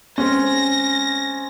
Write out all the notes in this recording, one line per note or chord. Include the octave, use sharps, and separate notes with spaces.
G#3 C4 C#4 A#6